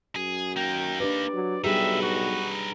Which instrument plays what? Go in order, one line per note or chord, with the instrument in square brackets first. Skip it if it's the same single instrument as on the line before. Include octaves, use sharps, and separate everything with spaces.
[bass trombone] F#2 [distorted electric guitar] G#4
[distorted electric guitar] A#3 D#4 [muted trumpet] G5
[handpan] D4 G4 B4 [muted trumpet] D5
[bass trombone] F#3
[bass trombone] B1 [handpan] G3 G4 G#4 [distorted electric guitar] D#4 B4 [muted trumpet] E5
[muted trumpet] F#4